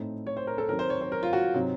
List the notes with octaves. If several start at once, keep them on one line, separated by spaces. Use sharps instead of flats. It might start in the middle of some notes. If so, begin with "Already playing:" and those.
Already playing: A2 A3 C4 D#4
C#5
C5
A#4
A4
D#3 F#3 C4 A#4
C5
C#5
C5
A#4
F4
F#4
C3 F#3 C4 D#4